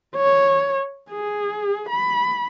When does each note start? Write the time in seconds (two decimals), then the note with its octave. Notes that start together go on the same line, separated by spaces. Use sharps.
0.16 C#5
1.10 G#4
1.90 B5